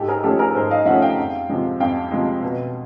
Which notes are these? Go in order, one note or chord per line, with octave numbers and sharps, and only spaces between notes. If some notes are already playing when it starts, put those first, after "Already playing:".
Already playing: G#2 G4 A4
G#4 A#4
F3 A3 C#4 G4 A4
G#4 A#4
G#2 A#4 C5
D#5 F5
F3 A3 C#4 E5 F#5
F5 G5
F2
C3 F3 G#3
F2 F5 G5
C3 F3 G#3
B2